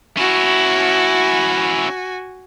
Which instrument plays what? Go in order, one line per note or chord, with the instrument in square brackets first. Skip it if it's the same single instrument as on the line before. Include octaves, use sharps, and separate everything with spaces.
[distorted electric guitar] C#4 E4 [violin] F#4 G#5